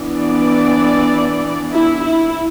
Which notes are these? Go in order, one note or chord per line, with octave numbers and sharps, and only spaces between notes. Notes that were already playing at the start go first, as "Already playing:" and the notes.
Already playing: E3 B3 D4
D5
E4
E4